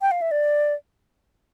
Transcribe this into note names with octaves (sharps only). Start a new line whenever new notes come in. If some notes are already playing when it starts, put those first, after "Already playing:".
G5
F5
E5
D5